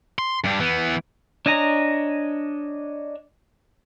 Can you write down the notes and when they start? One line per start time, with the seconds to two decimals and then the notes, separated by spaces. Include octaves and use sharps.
0.19 C6
0.44 G2 D4
0.60 E3 B3
1.46 D4 C#5 D#5 G#5 A#5